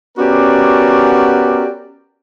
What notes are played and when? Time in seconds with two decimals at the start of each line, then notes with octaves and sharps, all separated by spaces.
0.17 B3 C#4 F#4 G4 A#4 D5